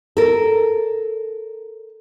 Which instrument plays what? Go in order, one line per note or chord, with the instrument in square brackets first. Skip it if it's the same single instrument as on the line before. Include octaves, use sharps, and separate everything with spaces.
[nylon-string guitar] A4 A#4